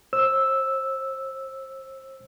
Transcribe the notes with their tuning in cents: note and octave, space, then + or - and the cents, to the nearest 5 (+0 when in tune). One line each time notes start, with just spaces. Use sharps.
C5 +30 E6 +0